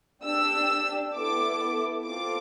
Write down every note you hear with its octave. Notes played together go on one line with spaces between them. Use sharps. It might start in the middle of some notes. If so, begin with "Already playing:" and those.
D4 G4 E6
B3 E4 A4 D6
C4 F4 A4 D6